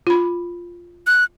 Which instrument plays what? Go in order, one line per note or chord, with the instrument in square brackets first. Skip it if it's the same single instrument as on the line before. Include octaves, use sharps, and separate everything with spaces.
[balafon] F4 B5
[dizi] F#6